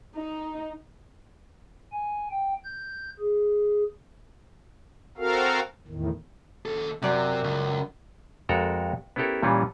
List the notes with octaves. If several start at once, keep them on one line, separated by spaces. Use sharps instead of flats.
D#4
G#5
G5
G6
G#4
C4 F#4 A4 A#4 F5
E2 A2 D#3
D#2 A4
F#2 C3 D5
C#2
F2 G#3 F#4 A4 A#4 A#5
B3 C#4 E4 G4 A4 A#4
A#2 E3 G3 C#4 F4